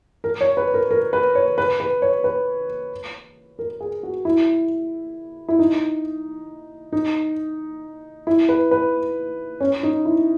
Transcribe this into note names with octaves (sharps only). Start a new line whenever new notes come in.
A#4
C#5
B4
A#4
A#4
B4
C#5
B4
B4
C#5
B4
A#4
G#4
F#4
E4
E4
D#4
D#4
E4
B4
B4
C#4
D#4
E4